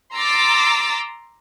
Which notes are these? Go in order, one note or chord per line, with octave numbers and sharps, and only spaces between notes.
A#5 C6 D6 E6 A6